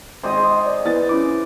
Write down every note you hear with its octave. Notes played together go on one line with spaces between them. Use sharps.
G#1 C5 D#5
G#4
D5
E3 B3 A6
C#4 E4 D6